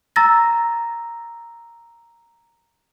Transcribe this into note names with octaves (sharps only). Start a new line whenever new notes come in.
A#5 E6 A6 A#6